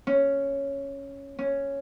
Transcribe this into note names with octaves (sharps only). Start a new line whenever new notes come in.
C#4
C#4